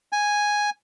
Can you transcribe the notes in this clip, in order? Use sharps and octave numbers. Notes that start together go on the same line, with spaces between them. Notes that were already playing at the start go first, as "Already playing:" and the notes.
G#5